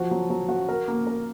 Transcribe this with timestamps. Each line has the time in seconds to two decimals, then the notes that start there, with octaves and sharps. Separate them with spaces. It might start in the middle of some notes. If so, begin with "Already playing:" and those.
Already playing: F3 F#4
0.11 F#3
0.30 F#3
0.49 F#4
0.69 A#4
0.88 A#3
1.07 A#4